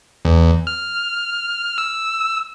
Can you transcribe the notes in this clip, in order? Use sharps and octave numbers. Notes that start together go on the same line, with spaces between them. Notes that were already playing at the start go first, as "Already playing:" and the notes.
E2
F6
E6